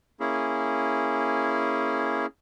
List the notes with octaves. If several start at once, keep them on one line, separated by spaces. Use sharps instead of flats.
A#3 C#4 E4 G#4